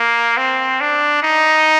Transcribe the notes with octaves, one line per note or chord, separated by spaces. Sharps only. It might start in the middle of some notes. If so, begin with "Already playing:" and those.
Already playing: A#3
C4
D4
D#4